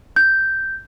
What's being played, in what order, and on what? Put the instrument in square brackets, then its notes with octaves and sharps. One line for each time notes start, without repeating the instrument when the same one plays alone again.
[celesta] G6